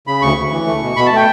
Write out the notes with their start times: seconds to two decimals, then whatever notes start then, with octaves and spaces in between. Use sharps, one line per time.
0.07 C#3 B5
0.22 D2 C#6
0.37 D2
0.52 E3
0.67 A3
0.82 B2
0.96 B2 B5
1.06 A5
1.12 A3 G5